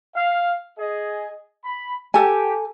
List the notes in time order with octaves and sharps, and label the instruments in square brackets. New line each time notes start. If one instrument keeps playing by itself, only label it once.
[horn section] F5
G#4 D#5
B5
[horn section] G4 [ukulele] A4 G#5